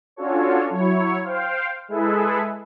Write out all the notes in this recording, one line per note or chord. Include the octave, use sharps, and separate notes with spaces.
C#4 D4 F4 F#4 A4 C#5
F#3 E4 C#5
C5 F5 G5
G#3 E4 G#4 A4 B4 E5